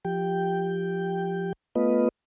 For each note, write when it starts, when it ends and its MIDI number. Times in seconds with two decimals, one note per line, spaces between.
0.05 1.53 53
0.05 1.53 67
0.05 1.53 79
1.75 2.09 57
1.75 2.09 59
1.75 2.09 65
1.75 2.09 71
1.75 2.09 75